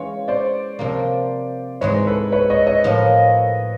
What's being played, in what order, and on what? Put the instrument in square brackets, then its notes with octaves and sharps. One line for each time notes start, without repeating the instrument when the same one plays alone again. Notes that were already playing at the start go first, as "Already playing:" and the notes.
Already playing: [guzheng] E3 G#3 C#4 F4 [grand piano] C#5
[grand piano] C5 D5
[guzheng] C3 F3 A#3
[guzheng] G#2 E3 G#3 [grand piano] B4 C#5
[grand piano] A4 B4
B4 C#5
C#5 D#5
C#5 D#5
[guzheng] A2 F3 A#3